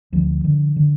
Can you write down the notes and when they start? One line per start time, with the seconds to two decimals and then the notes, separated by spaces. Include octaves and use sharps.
0.13 D2 F3
0.44 D3
0.76 D3